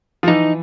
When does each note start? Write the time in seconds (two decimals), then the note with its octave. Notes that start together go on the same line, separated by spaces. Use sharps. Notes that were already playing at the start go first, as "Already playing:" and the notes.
0.23 F3
0.28 E3 D#4